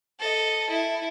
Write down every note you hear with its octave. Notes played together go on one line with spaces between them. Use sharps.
A4 D#5
E4